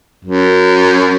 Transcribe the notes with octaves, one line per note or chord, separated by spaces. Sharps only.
F#2